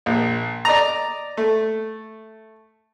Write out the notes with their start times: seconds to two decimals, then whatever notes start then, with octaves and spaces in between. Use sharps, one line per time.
0.06 A#1
0.65 D5 D#5 A#5
1.37 A3